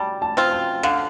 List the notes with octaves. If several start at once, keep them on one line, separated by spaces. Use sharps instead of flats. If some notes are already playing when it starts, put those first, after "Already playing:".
Already playing: G3 A5
A5
C4 F4
G5
D3 F5